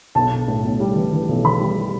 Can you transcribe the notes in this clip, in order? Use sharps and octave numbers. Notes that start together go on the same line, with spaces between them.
B1 A5
B1
A2
B1
G3
E3
E3
B1
E3 B5
G3
G3